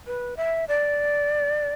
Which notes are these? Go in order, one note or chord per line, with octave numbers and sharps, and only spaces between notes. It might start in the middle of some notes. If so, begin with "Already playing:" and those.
B4
E5
D5